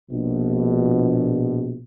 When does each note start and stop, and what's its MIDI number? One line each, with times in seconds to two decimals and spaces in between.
0.11 1.80 34
0.11 1.80 47